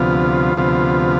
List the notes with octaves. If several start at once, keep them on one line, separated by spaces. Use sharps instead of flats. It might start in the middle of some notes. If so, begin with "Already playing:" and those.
Already playing: D2 C3 F3 B3 F4
D2 C3 F3 B3 F4